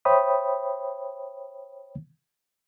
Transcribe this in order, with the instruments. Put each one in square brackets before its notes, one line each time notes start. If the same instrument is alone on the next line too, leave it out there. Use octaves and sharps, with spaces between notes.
[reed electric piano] C5 C#5 E5 G5 B5 D#6